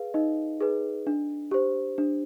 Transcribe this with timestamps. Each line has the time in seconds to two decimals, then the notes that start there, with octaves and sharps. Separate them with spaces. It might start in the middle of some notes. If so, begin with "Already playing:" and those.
Already playing: G#4 B4 F5
0.14 D#4 D#5
0.61 G#4 B4
1.07 D4
1.51 G4 C5
1.98 D4